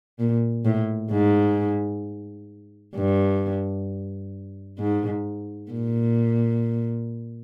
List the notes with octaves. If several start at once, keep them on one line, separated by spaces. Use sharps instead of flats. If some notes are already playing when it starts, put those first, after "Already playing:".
A#2
A2
G#2
G2
G#2
A#2